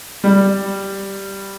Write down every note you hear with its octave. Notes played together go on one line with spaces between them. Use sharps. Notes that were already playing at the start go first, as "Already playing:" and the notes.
G3